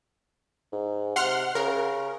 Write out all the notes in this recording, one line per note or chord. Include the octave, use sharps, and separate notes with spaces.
G#2
C3 F#5 C6 F6
C#3 A#4